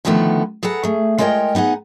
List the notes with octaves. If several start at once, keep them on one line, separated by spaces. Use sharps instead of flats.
B2 D3 D#3 F3 A3 B3
G#4 A4 B4 F#5 A#5
A3 G#4
G#3 F4 A#4 C#5 D#5 G5
B3 D#4 G#4 F#5